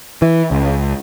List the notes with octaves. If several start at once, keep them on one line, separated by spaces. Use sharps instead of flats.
E3
C#2